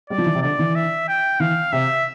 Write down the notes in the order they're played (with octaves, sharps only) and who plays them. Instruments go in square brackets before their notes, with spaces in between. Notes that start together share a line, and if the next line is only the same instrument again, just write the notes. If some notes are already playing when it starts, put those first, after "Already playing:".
[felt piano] G3 [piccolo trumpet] D5
[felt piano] F3
E3
C3
[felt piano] D3 [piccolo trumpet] D5
[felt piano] E3
[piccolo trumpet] E5
G5
[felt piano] E3 [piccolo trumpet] F5
[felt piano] C3 [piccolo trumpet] E5